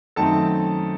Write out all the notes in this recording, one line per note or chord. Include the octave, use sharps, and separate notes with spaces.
F#2 D#3 A3 C4 D#4 A4 A5